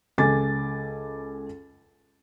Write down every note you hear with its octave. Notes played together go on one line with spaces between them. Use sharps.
C#2 A4 G#5 D6 A6